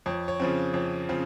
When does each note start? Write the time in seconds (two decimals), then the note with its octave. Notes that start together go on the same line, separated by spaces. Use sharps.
0.06 F2 C#5
0.28 C#5
0.40 C#3 F3 C4
0.74 F2 C#5
1.09 C#3 F3 C4